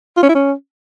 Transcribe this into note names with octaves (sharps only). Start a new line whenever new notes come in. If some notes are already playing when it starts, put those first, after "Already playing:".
F4
C#4
E4
C#4